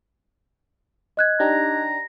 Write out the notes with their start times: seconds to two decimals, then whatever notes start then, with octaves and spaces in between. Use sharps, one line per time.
1.17 D#5 F#6 G#6
1.40 D4 D#4 G4 A#5